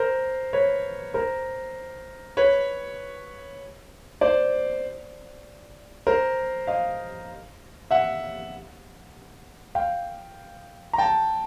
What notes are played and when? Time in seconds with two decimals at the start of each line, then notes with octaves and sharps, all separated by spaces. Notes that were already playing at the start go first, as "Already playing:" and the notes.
Already playing: A#4 C5
0.53 B4 C#5
1.14 A#4 C5
2.37 B4 C#5
4.21 C5 D5
6.07 A#4 C5
6.67 D#5 F5
7.91 E5 F#5
9.75 F5 G5
10.93 A#5
10.98 G5 A5